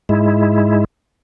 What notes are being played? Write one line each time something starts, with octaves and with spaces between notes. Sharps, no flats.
G#2 G#3 E4